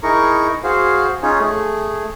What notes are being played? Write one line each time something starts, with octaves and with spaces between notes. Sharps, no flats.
D#4 E4 G#4 A#4 A#5 C#6
F#4 G#4 C5 F5
C#4 D#4 F4 G#4 C#5
A3 G#4